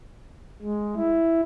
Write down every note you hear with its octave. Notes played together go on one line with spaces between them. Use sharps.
G#3
E4